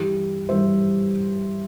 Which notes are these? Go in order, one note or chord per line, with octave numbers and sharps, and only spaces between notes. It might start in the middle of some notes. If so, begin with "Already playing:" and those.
Already playing: G2 E3 G3 E4 G4
G2 E3 G3 C5 E5